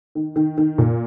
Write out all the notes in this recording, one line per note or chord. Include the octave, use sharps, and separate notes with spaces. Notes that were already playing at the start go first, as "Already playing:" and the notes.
D#3
D#3
D#3
A#2